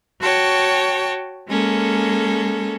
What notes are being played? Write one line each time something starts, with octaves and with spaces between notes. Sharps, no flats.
F#4 C#5 G5 A5
G#3 A#3 C#4 A4